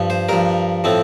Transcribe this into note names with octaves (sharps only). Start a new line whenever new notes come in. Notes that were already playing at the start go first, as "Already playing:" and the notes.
Already playing: G2 F3
C5
G2 F3 A#4
A2 F3 C4